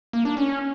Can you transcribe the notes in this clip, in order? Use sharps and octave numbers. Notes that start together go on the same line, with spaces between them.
A#3
D4
C#4